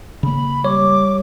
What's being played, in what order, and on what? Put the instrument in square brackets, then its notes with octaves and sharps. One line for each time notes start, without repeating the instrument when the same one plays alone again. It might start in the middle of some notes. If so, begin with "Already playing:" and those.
[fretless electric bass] C#3 A#3 [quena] B5
[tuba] G3 [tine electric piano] C#5 [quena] D6